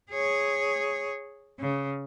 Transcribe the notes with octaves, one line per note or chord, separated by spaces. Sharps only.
G#4 C#5
C#3